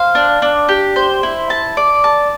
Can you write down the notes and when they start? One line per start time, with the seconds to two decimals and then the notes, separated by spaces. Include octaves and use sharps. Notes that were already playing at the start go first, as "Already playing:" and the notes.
Already playing: C5 F5
0.15 D4
0.42 D4
0.69 G4
0.96 C5
1.23 E4
1.50 A5
1.77 D5
2.04 A5